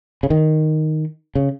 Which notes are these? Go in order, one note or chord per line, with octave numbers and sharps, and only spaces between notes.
C#3
D#3
C#3